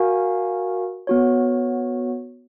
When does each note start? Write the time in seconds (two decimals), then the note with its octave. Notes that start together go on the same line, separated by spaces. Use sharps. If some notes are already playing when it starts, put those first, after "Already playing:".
Already playing: F#4 A#4 F5 G#5
1.07 B3 F#4 C#5